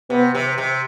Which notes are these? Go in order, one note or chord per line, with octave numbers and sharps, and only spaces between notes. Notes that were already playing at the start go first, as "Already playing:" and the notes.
C3 B3
C3
C3